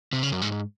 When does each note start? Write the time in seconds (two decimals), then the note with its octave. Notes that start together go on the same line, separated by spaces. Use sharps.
0.13 C3
0.23 C#3
0.32 F#2
0.42 G#2
0.52 G#2